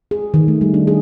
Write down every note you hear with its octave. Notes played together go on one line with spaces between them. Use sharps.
G#4
D#3
A3
G3
D4
G#4